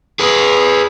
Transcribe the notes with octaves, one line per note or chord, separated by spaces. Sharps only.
G#4 B4